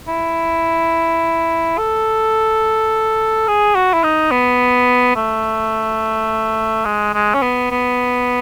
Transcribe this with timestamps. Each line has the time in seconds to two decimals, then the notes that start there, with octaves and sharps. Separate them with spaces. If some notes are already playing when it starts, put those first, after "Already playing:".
0.08 E4
1.78 A4
3.48 G#4
3.75 F#4
3.94 E4
4.04 D#4
4.31 B3
5.16 A3
6.85 G#3
7.14 G#3
7.34 C#4
7.42 B3
7.71 B3